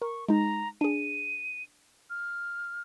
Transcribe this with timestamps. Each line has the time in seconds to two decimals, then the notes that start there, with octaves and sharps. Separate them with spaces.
0.02 A#4 C#6
0.28 G#3 D#4 A#5
0.81 D4 G#4 D#7
2.10 F6